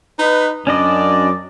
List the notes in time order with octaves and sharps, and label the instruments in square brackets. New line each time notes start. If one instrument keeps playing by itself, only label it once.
[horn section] D#4 B4
[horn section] F#2 D5 [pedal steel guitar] C#4 D4 D#5